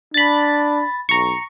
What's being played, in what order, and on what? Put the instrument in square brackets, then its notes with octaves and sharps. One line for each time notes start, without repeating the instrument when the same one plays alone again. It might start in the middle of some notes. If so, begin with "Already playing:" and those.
[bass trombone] D4 [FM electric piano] B5 A6
[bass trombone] B1 [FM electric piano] A#5 C#6